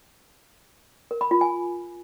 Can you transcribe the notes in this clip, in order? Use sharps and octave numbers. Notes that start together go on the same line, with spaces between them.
A#4
B5
F4
G#5